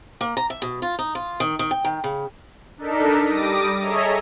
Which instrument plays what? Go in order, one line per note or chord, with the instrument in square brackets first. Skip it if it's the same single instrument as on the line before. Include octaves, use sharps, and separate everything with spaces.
[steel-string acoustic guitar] A#3
A#5
E5
B2
F4
D#4
F4
D#3
D#3
G5
D#3
C#3
[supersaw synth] D4 D#4 A4 A#4 B6
G3 D6 D#6 A#6
G#4 A4 C#5 D#5 E5 A#5